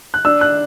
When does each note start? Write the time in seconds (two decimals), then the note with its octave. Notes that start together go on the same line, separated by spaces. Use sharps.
0.14 F#6
0.25 D4 E6
0.41 F#6